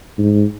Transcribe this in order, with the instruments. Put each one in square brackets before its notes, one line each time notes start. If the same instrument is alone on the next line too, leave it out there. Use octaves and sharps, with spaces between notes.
[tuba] G#2